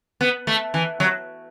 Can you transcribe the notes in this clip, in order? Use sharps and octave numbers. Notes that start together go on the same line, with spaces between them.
B3
A3
E3
F#3